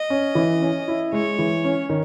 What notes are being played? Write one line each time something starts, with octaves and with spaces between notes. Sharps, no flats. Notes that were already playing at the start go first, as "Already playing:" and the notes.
Already playing: D#5
C#4
E3
C#4
E4
G#3 C#5
E3
C#4
D#3